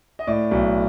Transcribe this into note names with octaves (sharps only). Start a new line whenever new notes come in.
D#5
A2 D5
B1